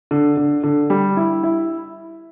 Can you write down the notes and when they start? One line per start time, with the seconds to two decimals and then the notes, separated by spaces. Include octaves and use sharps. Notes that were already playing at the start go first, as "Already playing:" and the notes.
0.11 D3
0.37 D3
0.64 D3
0.90 G3
1.17 E4
1.43 E4